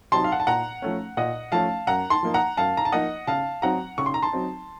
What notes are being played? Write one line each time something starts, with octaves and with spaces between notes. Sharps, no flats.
C3 F#3 C4 D#4 A5 C6
F5
F#5
A5
A#2 F#5 A#5
F3 A3 C#4
A#2 D#5 F#5
F3 A3 C#4 F5 A5
F#2 F#5 A#5
A5 C6
F3 A#3 D#4
F#5 A#5
F#2 F5 A5
A#5
A5
F3 A#3 D#4 D#5 F#5
C#3 F5 A5
F#3 C4 D#4 F#5 A#5
C#3 C#6
C6
A#5
A5 C6
F#3 C4 D#4